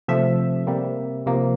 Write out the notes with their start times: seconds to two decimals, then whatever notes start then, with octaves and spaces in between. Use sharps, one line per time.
0.08 C3 F3 A3 E5
0.67 C3 G3 A#3
1.26 C3 F3 A#3